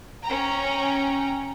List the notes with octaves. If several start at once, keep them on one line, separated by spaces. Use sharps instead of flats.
C#4 G5 A#5